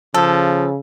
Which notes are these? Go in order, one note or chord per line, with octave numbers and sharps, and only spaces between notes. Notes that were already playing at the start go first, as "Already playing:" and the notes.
C#3 F3 A4